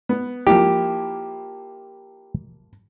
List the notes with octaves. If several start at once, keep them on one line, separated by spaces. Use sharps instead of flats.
B3
F3 A#3 E4 G4